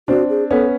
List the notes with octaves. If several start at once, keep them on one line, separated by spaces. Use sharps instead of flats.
C4 D4 F#4
G#4
B3 C#4 A4